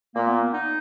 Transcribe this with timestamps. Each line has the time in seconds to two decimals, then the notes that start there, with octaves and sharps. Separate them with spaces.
0.15 A#2 A#3
0.28 B3
0.40 B3
0.53 D#4